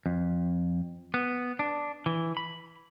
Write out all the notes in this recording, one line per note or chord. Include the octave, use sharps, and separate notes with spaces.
F2
B3
D4
E3
B5